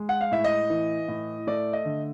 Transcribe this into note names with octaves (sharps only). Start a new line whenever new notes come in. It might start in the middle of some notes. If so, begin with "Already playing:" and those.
Already playing: G#3
F#5
F5
A2 E5
D#5
E3
A2
A3 D5
D#5
D3